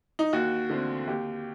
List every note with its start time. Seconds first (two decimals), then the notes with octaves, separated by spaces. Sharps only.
0.19 D#4
0.33 D#2 F#4
0.70 D3 A3 C4
1.07 D#2 G4